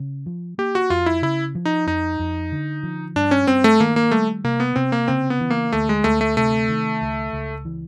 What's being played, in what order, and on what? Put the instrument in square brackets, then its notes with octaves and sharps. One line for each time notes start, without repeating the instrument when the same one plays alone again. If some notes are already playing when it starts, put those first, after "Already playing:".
Already playing: [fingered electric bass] C#3
F3
[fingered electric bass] A#3 [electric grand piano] G4
[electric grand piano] F#4
[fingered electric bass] F2 [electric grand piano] F4
[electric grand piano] E4
[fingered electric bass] C#3 [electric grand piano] E4
[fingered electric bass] F3
[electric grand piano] D#4
[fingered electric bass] F2 [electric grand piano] D#4
[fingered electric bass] F2
D3
F3
[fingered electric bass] G2 [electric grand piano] D4
[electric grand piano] C#4
[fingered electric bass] G2 [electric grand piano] C4
[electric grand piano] A3
[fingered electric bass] D#3 [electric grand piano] A#3
[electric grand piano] A#3
[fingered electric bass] G3 [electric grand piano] A3
[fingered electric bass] C3 [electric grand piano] A#3
[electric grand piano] B3
[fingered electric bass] C3 [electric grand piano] C4
[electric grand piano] A#3
[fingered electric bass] C#3 [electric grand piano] C4
[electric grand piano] B3
[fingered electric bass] E3
[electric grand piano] A#3
[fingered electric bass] D2 [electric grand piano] A3
[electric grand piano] G#3
[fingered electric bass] D2 [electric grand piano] A3
[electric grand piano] A3
[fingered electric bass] C3 [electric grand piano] A3
[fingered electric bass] D#3
C#2
C#2
E3